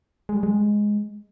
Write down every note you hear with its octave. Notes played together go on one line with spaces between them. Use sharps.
G#3
G3
G#3